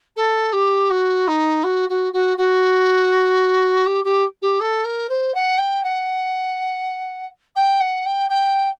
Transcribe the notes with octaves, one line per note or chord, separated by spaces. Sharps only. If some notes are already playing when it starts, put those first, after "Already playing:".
A4
G4
F#4
D#4
F#4
F#4
F#4
F#4
G4
G4
G4
A4
A#4
C5
F#5
G5
F#5
G5
F#5
G5
G5